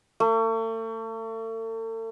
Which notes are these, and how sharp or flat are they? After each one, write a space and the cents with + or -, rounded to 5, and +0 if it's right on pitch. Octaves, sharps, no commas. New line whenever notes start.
A3 +40